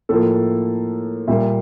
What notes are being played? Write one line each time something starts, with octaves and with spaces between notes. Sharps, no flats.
A2 F3 A#3 A4
A#2 G3 A#3 E5